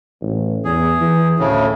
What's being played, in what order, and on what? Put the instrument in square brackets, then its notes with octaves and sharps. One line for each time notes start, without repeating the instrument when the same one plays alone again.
[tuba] A1
[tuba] E2 [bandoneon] G#4
[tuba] E3
[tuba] D2 [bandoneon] A2 C#3